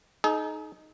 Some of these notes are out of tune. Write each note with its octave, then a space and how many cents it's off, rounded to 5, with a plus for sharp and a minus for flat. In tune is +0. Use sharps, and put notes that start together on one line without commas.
D#4 +0 G#4 +45